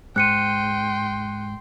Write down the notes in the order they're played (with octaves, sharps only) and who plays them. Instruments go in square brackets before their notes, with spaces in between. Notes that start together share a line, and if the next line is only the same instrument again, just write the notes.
[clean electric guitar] G#2 [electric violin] G5 C6 [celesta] F#6 C#7 D#7